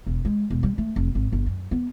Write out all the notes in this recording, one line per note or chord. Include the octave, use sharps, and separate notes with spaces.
E1
G#3
E1
G3
A3
F1
G#1
G1
F#2
B3